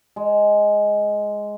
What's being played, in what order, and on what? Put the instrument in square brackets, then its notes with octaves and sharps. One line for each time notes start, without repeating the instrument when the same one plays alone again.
[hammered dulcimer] G#3